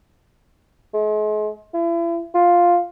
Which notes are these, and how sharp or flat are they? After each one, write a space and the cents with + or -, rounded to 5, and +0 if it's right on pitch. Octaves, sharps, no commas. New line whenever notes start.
G#3 +40
E4 +40
F4 +5